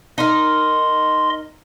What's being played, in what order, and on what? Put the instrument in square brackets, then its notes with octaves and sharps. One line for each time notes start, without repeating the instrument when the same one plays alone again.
[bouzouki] D#4 A#4 [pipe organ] D#5 C6